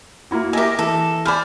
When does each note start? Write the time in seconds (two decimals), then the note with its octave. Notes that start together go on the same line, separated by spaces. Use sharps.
0.31 A#3 E4 F#4
0.53 G4 A#4 D#5 E5 G#5
0.79 E3 A4
1.26 C5 D5 G#5 B5 F6